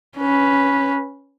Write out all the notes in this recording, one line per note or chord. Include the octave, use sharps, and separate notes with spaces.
C#4 B4